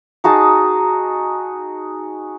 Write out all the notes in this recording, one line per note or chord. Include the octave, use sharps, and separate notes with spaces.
D#4 F#4 G#4 A5